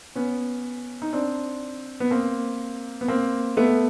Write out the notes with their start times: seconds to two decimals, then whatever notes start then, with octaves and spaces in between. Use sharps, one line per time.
0.15 B3 C#4
1.02 D#4
1.13 C4 D4
2.00 B3
2.10 A#3 C4
3.01 B3
3.08 A#3 C4
3.57 A3 B3